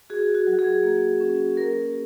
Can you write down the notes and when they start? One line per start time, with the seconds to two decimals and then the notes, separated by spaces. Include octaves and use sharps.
0.10 F#4 G#4
0.34 F#4
0.47 F#3
0.59 G#4
0.83 A#3
1.21 C#4
1.57 A#3 A#4